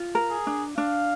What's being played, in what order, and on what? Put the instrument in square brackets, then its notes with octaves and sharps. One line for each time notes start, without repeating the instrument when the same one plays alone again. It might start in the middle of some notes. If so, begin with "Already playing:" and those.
Already playing: [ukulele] F4
A#4
[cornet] G#4
[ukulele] D4
[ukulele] D4 [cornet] F5